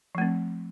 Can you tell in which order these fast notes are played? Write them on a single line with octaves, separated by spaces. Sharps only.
F3 A3 C4